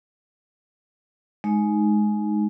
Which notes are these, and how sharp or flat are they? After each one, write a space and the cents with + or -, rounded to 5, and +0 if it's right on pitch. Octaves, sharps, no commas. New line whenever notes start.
G#3 +20 D#4 +0